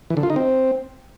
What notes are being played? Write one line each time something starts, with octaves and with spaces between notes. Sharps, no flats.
E3
D3
F4
D#4
C4